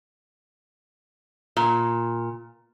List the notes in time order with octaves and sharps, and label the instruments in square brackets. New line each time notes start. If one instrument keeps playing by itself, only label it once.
[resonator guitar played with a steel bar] A#2